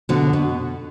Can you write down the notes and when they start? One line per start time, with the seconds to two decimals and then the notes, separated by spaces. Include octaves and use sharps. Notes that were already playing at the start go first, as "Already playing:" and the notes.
0.09 B2 D3
0.33 B2